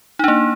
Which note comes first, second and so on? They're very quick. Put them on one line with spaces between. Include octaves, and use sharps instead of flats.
D#4 D4 A#3